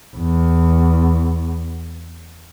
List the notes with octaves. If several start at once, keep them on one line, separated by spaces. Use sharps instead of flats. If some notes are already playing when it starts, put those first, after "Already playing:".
E2